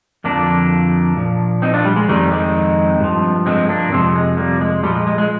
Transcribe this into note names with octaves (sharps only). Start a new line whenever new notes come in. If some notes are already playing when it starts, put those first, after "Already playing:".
F2 D3 F3 A#3 D4
A#2 F3
C4 D#4
D4 F4
G3
G#3
F2 D#3 G3
G#3 C4
G2 F3
G#3 C4
A#3 D4
F2 C3 F3 G#3 C4
G#3
G3 A#3
G#3
A#2 F3 G3
G#3
G#3
G#3